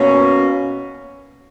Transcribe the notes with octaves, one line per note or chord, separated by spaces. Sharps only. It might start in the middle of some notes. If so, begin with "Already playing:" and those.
Already playing: B2 A#3 C#4